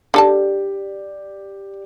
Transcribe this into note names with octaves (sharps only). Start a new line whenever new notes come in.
D3 G4 A4 D5 A5